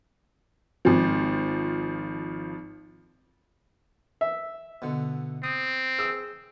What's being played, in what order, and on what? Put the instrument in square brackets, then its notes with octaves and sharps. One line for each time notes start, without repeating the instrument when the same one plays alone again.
[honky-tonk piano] G#1 F3
[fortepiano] E5
[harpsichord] B2 D3
[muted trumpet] C4 [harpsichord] D#6
[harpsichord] G#4 G5 [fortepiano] E6